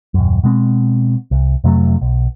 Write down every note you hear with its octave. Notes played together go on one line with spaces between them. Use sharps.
D#1 F#2
B2 G#3 C4
C2
F2 C3 F#3 A3
B1